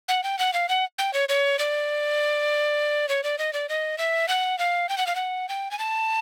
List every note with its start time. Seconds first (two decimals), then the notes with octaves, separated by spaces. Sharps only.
0.08 F#5
0.24 G5
0.39 F#5
0.53 F5
0.69 F#5
0.99 G5
1.14 C#5
1.29 C#5
1.59 D5
3.09 C#5
3.24 D5
3.38 D#5
3.53 D5
3.69 D#5
3.98 E5
4.28 F#5
4.59 F5
4.89 G5
4.98 F#5
5.07 F5
5.16 F#5
5.49 G5
5.71 G#5
5.79 A5